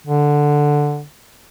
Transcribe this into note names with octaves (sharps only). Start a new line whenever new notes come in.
D3